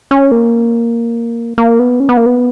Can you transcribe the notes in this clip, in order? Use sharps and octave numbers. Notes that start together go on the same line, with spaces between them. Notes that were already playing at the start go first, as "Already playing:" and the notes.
C#4
A#3
A#3
B3
C#4
B3
A#3
B3